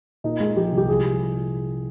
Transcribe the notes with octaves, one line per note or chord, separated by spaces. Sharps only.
A#2 D#4
G#3
F3 G4
C2
G4
F3 G#4